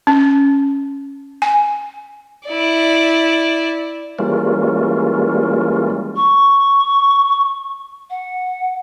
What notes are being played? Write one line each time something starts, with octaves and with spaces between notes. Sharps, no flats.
C#4
G#5
E4 D5
E3 G3 G#3 A#3 C#4 F4
C#6
F#5